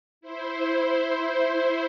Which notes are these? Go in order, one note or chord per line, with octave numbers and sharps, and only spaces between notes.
E4 C5